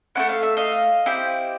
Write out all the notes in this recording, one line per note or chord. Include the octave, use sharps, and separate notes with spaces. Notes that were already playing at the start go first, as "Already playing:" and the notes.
A3 C#4 E4 F#5
F5
E5
D#5 F5
C4 E4 G4